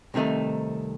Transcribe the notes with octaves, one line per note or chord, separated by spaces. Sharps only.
C2 C3 D#3 A3 D#4